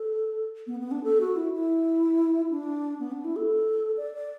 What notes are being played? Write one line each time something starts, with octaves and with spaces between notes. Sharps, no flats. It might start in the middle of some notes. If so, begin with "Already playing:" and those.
Already playing: A4
B3
B3
D4
A4
F#4
E4
E4
D4
B3
D4
E4
A4
D5
D5